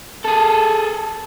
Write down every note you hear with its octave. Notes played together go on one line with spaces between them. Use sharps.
G#4 A4